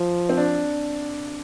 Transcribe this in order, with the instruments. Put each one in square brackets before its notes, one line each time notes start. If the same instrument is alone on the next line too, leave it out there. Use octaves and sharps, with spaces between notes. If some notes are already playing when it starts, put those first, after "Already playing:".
Already playing: [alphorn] F3
[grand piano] C4
D4